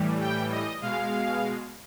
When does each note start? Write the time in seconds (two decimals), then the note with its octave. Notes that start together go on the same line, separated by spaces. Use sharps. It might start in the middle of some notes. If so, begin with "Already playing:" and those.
Already playing: A2 E3 G3
0.21 G5
0.52 D#5
0.82 B2 G#3 F5